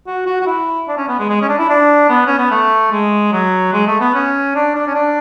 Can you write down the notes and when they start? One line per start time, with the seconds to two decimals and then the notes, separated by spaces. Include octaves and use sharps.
0.07 F#4
0.26 F#4
0.41 F#4
0.46 E4
0.88 D4
0.97 C#4
1.08 B3
1.19 G#3
1.29 G#3
1.42 C#4
1.49 D4
1.59 E4
1.69 D4
2.09 B3
2.26 C#4
2.38 B3
2.51 A3
2.92 G#3
3.32 F#3
3.73 G#3
3.87 A3
4.00 B3
4.14 C#4
4.55 D4
4.76 D4
4.87 C#4
4.95 D4